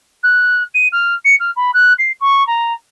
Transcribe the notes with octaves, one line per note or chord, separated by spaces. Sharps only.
F#6
D#7
F6
C#7
F6
B5
F#6
C7
C#6
A#5